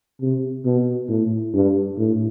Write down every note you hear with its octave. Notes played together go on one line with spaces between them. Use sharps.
C3
B2
A2
G2
A2